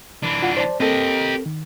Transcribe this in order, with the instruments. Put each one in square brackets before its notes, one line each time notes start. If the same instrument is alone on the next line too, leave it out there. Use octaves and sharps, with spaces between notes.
[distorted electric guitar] E3 D4
[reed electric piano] F4 F#5
C5 D5 A5
[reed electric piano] C4 A4 A#4 [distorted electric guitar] G4 D#5
[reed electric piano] D#3